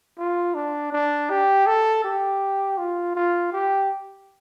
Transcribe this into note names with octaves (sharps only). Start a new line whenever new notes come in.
F4
D4
D4
G4
A4
G4
F4
F4
G4